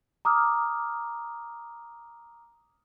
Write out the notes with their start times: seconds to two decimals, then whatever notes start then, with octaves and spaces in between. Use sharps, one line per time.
0.25 A#5 D6 D#6 F6